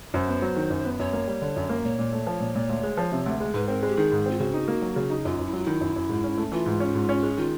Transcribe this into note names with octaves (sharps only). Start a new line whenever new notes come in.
F#2 C5
B3
F#3
D#3
F#2
B3
F#2 C#5
A#3
G3
D3
F#2
A#3
A#2 C#5
A#2
A3
F3
A#2
A#2
D2
G#3
F3
C3
D2
G#3
G#2 B4
C4 A#4
G#3 G4
D#3 G#4
G#2
C4
F4
C#3 F#4
D#4
A#3
F#3
C#3
D#4
F#2 F4
F#2
E4
F#3 F4
D#3 E4
F#2
F#2
G#2
C#4
A3
E3 F4
G#2
C#4
G#2
C#4
G#3
D#3 F4